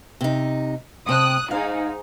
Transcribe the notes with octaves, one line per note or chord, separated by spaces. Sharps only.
C3 D#4
C3 G5 A5 D#6 F#6
G#2 D#4 F5